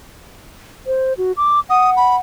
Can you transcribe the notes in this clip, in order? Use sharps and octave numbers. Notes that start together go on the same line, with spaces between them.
C5
F#4
D6
F#5 D#6
B5